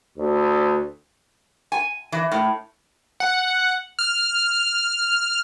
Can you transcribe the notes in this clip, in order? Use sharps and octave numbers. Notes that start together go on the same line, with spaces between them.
D2
G#5
E3
A2
F#5
F6